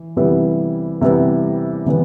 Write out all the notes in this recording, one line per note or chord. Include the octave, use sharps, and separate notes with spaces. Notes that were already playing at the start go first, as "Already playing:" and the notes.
Already playing: E3
C3 E3 G3 B3 E4
C3 E3 G3 B3 E4
C3 E3 G3 B3